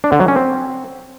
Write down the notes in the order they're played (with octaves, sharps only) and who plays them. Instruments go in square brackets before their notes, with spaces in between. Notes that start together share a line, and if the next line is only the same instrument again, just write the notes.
[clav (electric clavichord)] D4
D3
F#3
C#4
C4